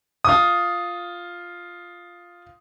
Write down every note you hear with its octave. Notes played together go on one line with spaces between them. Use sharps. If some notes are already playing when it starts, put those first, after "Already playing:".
F4 D#6